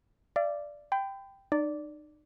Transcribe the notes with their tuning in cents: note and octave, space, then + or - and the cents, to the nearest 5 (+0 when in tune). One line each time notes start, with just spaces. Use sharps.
D5 +0 F5 -45
G5 +0 B5 +40
D#4 -40 D5 -10